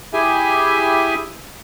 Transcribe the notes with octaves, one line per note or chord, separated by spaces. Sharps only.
E4 G4 G#4 E5 G#5